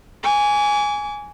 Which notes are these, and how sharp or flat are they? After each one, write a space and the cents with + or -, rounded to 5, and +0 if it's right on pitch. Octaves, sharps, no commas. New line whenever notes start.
G#5 +0 D6 -40